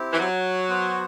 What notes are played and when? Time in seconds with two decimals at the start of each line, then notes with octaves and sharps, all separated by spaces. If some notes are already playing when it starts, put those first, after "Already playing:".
Already playing: C4 E4 G4
0.12 E3
0.19 F#3
0.69 B3 F#4 C5 F#5